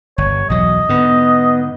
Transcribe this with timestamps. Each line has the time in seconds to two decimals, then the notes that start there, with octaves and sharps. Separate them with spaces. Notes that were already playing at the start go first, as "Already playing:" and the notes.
0.18 G1 C#5
0.50 B1 E2 F#3 D#5
0.89 G#2 D3 B3